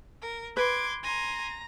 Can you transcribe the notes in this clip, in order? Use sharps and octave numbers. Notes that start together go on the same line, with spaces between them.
A#4
B4 C6 D6 G#6
G#5 A#5 C6 A#6